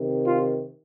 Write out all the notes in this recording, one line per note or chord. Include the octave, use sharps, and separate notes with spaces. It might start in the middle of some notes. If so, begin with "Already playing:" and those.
Already playing: C3 D#3
F4